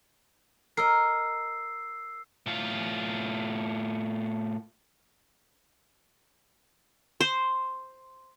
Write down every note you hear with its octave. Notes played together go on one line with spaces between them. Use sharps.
A#4 D#5 E6 C7
A2 F4
C5